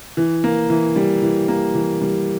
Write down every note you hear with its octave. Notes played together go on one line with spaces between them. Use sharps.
E3
A#3
E3
G3
E3
A#3
E3
G3